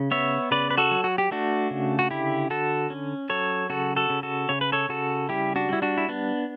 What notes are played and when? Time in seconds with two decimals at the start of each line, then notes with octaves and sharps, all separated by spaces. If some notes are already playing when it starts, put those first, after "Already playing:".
Already playing: C#3
0.11 B3 C#5 E5
0.51 C#3 B4 D5
0.71 B4
0.77 F#4 A4
0.91 F#3
1.04 F#4
1.18 G4
1.31 A3 D4 F#4
1.71 C#3
1.99 F#4
2.11 D3 E4 G4
2.50 D3 F#4 A4
2.90 C#4
3.30 F#3 A4 C#5
3.70 C#3 F#4 A4
3.96 F#4 A4
4.10 C#3
4.23 F#4 A4
4.49 C#3 C#5
4.61 B4
4.72 A4 C#5
4.89 C#3 F#4 A4
5.29 G3 E4 G4
5.56 D4 F#4
5.69 G3 E4
5.82 D4 F#4
5.97 E4
6.09 B3 D4